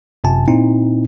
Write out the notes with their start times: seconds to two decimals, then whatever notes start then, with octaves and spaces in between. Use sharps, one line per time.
0.24 G1 F#2 C3 G#5 A5
0.48 A#2 C4 D#4 E4